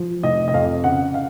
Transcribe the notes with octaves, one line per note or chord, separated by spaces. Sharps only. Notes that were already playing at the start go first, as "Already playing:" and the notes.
Already playing: F3
F1 D#5
D#5
F2 F5
C#3 F#5
F5